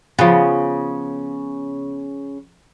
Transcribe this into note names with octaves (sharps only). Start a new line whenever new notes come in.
C#3 F3 B3